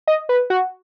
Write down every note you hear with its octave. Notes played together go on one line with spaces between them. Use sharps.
D#5
B4
F#4